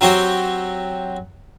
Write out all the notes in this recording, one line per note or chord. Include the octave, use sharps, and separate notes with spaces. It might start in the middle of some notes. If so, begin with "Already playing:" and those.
F#3 C4 F#4 G4